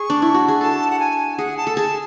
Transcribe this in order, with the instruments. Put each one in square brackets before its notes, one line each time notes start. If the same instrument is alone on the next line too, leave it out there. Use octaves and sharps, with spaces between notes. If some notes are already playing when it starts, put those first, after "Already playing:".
Already playing: [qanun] G#4 [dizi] C#6
[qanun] D4
E4
F#4
G#4
[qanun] A4 [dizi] A5
[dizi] F#5
G#5
[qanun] G#4 [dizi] F#5
[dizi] A5
[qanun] A4
[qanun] G#4 [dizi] A5